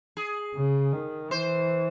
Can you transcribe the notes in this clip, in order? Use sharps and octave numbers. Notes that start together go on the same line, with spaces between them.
G#4
C#3
D#3
E3 C5